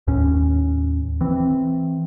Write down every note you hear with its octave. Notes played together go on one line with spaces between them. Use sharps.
D#2 A2 C#4
E3 C4